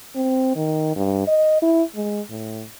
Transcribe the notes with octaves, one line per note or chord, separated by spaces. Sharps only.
C4
D#3
G2
D#5
E4
G#3
A2